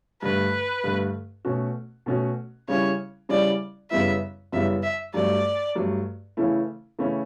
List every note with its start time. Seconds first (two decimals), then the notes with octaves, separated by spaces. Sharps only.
0.22 G2 D3 A3 B4
0.84 G2 D3 A3
1.45 B2 A3 C#4 F#4
2.06 B2 A3 C#4 F#4
2.68 C#3 G3 C#4 E4 C#5
3.29 C#3 G3 C#4 E4 D5
3.91 F#2 C#3 G3 B3 E4 E5
4.52 F#2 C#3 G3 B3 E4 E5
4.83 E5
5.14 G2 F#3 A3 D5
5.75 G2 F#3 A3
6.37 C#3 E3 A3 C#4 E4
6.99 C#3 E3 A3 C#4 E4